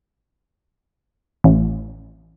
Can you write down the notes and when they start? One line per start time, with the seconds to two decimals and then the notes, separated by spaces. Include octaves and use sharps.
1.44 A1